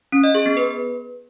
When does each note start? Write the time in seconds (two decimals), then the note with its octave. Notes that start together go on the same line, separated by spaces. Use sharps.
0.12 C#4
0.24 D#5
0.35 G#4
0.46 B3
0.57 B4